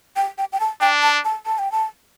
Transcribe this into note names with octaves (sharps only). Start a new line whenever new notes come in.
G5
G5
G5
A5
D4 G5
A5
A5
A5
G5
A5